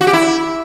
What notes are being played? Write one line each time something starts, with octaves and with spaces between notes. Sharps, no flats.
F#4
G4
E4